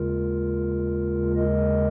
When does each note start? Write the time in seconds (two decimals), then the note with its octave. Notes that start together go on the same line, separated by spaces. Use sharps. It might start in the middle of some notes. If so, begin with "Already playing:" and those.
Already playing: D#2 C#3 G#3 F4 A#4
1.36 A#4 D#5